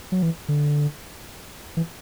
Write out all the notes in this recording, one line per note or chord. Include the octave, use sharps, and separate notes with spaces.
F#3
E3
D3
E3